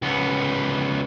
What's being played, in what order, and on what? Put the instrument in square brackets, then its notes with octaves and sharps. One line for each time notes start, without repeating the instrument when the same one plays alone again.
[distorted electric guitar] C#2 B3